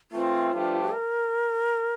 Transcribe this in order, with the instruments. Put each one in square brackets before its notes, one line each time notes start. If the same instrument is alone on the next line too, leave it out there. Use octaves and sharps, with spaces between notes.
[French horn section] E3 A3 C4 [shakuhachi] F4
[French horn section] G2 F3 A3 D4 G4
[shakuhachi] A#4